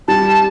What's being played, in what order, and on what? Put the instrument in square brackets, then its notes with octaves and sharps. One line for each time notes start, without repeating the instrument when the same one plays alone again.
[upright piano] G3 [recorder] A5